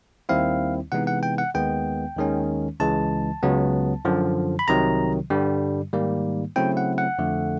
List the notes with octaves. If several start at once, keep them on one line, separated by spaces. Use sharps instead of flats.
D#2 D#3 G3 C4 E4 F5
C3 E3 G#3 B3 D#4 F#5
F#5
G5
F#5
D#2 D#3 G#3 B3 G5
D#2 D#3 G#3 C#4
C#2 C#3 E3 G#3 A5
C#2 C#3 F#3 B3
F#2 D3 F3
B5
C2 C3 D#3 F#3 A#5
G2 D3 G3
G#2 D#3 G3 A#3
C#3 F#3 A3 C4 E4 G5
F#5
F#5
F2 D3 F3 A3